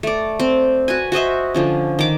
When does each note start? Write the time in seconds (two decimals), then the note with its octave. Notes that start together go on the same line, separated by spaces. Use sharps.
0.03 A3 D5
0.40 C4
0.88 F#4 B4 G#5
1.12 F#4 C5 D#5 E5
1.54 D3 F3 C#4
1.99 D#3 D6